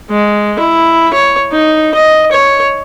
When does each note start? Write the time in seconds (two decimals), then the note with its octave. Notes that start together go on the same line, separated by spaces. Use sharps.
0.10 G#3
0.59 E4
1.13 C#5
1.52 D#4
1.94 D#5
2.32 C#5